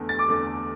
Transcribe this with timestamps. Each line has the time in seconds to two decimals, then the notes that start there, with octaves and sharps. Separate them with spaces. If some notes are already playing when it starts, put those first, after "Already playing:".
Already playing: E2 D3 A3
0.09 A6
0.19 D6
0.28 E2 D3 A3